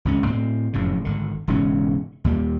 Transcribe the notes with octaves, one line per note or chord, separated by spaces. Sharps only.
G#1 C#2 C#4
A2 C4
F1 F#2 A2 C#3
G#1 D3
E1 G#2 C#3 C#4
D#2 A#2 G3